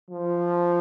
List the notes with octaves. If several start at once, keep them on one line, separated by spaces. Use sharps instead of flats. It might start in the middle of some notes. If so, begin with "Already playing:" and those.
F3